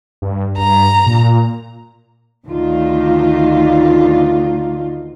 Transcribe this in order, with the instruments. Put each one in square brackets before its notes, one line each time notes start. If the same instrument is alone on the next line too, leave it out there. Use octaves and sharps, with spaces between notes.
[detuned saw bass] G2
[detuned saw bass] G2 [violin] A#5
[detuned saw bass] A#2
[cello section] D2 D3 D#3 F4